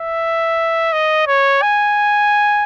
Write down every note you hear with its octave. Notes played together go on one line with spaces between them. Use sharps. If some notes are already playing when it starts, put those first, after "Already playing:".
Already playing: E5
D#5
C#5
G#5